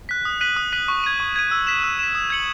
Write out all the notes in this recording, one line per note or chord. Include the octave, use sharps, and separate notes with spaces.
F#6 B6
D#6
F#6 B6 D#7 F#7
D#6
F#6 B6 D#7 F#7
C#6
G#6 D#7
C#6
G#6 D#7
E6
B6 E7
E6
B6 E7
D#6
G#6 C#7 F#7